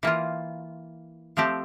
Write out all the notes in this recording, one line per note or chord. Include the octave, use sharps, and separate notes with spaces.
E3 A#3 F4
F3 A3 C4 G4